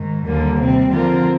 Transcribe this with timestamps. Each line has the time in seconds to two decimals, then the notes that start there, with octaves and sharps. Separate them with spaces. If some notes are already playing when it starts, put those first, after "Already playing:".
Already playing: G#2 D#3
0.25 D#2 D3 G3 A#3
0.59 C3 G3 C4
0.91 D3 F3 C4 F4 A#4